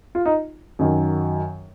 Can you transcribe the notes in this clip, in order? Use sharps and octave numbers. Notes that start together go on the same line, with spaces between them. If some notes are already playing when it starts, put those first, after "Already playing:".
F4
D#4
F#2 D#3 F#3